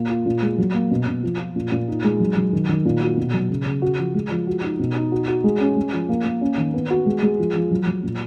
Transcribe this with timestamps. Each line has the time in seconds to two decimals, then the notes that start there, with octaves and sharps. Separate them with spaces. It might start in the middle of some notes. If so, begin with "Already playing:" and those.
Already playing: A#2 A#3
0.10 F4
0.26 A#2
0.42 G#3
0.58 F#3
0.75 A#3
0.91 B2
1.07 B2
1.23 F3
1.39 F4
1.56 A#2
1.72 A#2
1.88 D#4
2.04 G#3
2.20 F#3
2.37 F#3
2.53 D#3
2.69 D#3
2.85 A#2
3.01 F#4
3.18 B2
3.33 F#3
3.50 C#3
3.66 C#3
3.82 F#4
3.98 F3
4.15 G#3
4.31 F3
4.47 F#4
4.63 D#4
4.79 B2
4.96 D#4
5.12 F#4
5.28 F#4
5.44 G#3
5.60 C#4
5.76 G#3
5.93 F3
6.09 A#3
6.26 A#3
6.41 C#4
6.57 D#3
6.74 B3
6.90 F#4
7.06 G#3
7.23 G#3
7.39 F3
7.55 F3
7.71 F#3
7.87 F#3
8.03 A#2